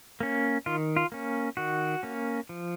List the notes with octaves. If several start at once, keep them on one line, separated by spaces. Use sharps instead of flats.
A#3 C#4
D#3 F4
F4
A#3 C#4
D#3 F#4
A#3 C#4
F3